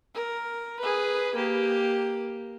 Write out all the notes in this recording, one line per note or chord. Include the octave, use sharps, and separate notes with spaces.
A#4
G#4 B4
A#3 G4